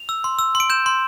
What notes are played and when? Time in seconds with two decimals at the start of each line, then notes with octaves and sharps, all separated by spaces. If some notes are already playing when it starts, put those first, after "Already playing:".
Already playing: F7
0.09 E6
0.24 C6
0.39 E6
0.55 C6
0.60 D7
0.70 G6 E7
0.86 C6